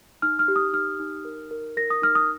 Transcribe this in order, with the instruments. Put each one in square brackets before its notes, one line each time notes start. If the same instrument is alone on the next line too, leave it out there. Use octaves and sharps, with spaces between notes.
[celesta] D#4 F6
F6
G4
D#6
D#4 F6
D#4
A#4
A#4
A#4 A#6
D#6
D#4 F6
D#6